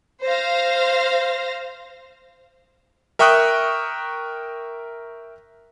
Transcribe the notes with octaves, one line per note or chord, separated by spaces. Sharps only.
C5 F5 A#6
A#4 E5 G5 C#6 D#6 F#6